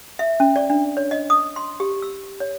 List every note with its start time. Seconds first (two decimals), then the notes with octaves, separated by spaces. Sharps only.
0.19 E5
0.40 C#4
0.56 D5
0.70 D4
0.97 C#5
1.11 D#5
1.30 D#6
1.56 C6
1.80 G4
2.02 E6
2.40 C#5